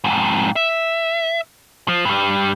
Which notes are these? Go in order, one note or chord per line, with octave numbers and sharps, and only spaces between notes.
F2 G#2
E5
F3
G2 G3